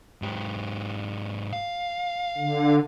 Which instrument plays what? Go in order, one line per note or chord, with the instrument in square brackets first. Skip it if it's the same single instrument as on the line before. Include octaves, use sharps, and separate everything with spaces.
[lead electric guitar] G#2 G4
F5
[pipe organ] D3